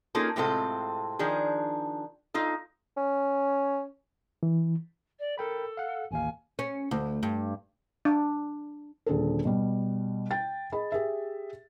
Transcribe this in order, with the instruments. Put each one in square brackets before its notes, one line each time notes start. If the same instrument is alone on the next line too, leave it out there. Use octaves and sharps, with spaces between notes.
[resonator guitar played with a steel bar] A#3 C#4 D#4 F4 G#4 A4
A2 C3 G#3 C4 F4 A4
D#3 F3 D4 G#4
D#4 F4 A4
[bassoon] C#4
[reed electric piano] E3
[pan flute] D5
[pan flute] A4 [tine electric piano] A#4 G5 B5
[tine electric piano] F5 F#5
[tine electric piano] A1 D#2 F5 [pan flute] G#5
[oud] C#4
D2
G2
[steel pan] D4
[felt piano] D#1 D3 G#4 A4
B2 G3
G5 A6
G#4 D#5 B5
G4 G#4 E5